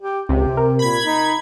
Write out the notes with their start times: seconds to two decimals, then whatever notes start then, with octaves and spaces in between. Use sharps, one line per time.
0.01 G4
0.29 C#2 C3 G4
0.57 A#4
0.79 A#2 B5 G#6
1.04 D#4